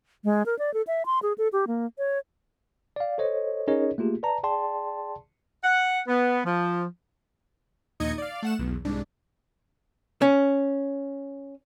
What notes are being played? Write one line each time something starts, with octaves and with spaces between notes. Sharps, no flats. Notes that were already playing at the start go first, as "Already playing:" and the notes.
G#3
A#4
D5
A4
E5
C6
G#4
A4
G4
A#3
C#5
D5 F5
A4 C5 C#5 D#5
C#4 D#4 G#4 A#4 C#5 D#5
A3 A#3 F4 G4 G#4
B4 D5 A5 A#5
G#4 D5 G5 A5 C6
F#5
B3
F3
A#1 D#2 D#4 D#5 G#6 C#7
D5 F5
A3 F#5 E7
B1 E2
C2 G#2 D4
C#4